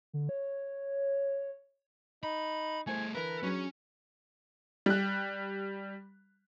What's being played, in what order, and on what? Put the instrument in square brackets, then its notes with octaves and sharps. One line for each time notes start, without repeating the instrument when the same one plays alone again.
[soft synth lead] D3
C#5
[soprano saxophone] D#4 [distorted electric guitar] B5
[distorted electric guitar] A3 G#4 [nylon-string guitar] E4 C5 [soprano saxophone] G#5
[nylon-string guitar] D3 E3 [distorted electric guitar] A#4 [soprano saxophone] B4
[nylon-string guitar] F#3 D4 G#4 [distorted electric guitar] C#4
[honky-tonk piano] G3 F#6